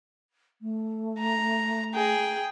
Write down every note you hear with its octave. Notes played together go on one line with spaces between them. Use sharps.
A3
A#5
G#4 G5